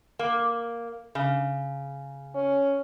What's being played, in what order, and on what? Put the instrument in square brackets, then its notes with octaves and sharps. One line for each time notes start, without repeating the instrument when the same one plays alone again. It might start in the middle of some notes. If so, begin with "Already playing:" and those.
[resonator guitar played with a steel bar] A#3
C#3
[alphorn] C#4